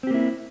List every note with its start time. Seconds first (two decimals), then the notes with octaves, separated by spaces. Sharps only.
0.03 C4
0.07 G4
0.11 A#3
0.14 E4